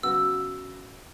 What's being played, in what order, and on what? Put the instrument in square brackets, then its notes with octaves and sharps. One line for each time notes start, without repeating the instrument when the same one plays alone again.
[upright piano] C#3 F#3 B3 F#4 [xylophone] E6